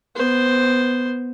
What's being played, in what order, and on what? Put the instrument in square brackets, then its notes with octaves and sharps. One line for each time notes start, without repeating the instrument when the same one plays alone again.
[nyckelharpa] B3 C5